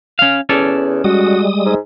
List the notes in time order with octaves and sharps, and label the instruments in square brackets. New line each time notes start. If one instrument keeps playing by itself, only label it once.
[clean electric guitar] C#4 F5
[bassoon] E2 [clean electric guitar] C#4 A4 D5
[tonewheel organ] G3 G#3 D#6 [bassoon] F#4
[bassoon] G#2